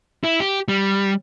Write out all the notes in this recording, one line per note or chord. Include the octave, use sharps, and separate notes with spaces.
E4
G4
G3